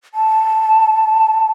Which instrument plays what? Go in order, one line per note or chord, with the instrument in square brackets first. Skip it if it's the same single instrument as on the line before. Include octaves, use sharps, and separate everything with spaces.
[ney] A5